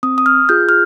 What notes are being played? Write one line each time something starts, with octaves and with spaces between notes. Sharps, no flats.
C4 D#6
D#6
F6
F4 G#4 G6
F6